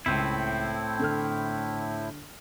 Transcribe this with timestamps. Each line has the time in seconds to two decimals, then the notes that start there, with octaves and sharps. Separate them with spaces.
0.06 C#2 A2 C4 E4
0.99 D3 A4 F6